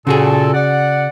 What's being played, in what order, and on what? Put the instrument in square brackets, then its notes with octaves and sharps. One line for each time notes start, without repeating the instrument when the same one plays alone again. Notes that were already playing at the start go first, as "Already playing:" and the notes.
[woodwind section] A#2 A4 [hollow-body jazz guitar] C#3 F#4 G#4
[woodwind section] D5 F#5